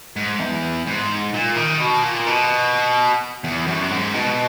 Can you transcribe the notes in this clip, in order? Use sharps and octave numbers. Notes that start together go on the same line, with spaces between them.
G#2
E2
G#2
A#2
D#3
B2
A#2
B2
E2
F#2
G#2
B2